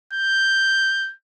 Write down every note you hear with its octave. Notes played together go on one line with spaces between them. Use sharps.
G6